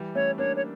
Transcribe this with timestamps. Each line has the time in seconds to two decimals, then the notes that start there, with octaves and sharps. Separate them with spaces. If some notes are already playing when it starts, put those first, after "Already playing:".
Already playing: E3 G3
0.15 A3 C#4 C#5
0.38 A#3 D4 C#5
0.56 C#5